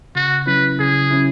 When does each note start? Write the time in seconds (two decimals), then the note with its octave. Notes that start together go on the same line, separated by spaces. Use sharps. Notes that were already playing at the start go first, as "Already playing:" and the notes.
0.15 C#3 F#4
0.47 F#3 C#4 E4 B4
0.79 C#3 G#4
1.11 F#3 C#4 E4